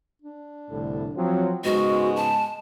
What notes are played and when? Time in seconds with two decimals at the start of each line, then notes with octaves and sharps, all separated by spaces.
0.22 D4
0.69 C2 A2 D3
1.15 F3 F#3 C4
1.64 G#2 C#3 G#3 B3 F#4
2.16 A5